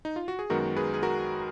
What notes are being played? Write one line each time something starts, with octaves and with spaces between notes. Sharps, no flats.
D#4
F4
F#4
G#4
F#2 D#3 G#3 B3 F#4 A#4
G#4 B4
G#4
F#4 A#4